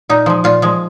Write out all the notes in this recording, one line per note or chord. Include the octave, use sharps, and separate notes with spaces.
A#2 D#4
F3 G#3
A#2 F4
F3 G#3